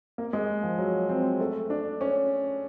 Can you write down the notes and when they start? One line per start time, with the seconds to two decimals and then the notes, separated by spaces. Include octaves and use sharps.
0.18 A#3
0.33 G#3
0.63 F3
0.78 F#3
1.09 C4
1.40 A3
1.70 D4
2.01 C#4